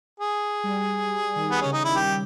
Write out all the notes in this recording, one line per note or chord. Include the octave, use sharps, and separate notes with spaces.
G#4
G3
G3
D#3
B3
C#3 C#4
D#4
E4
G4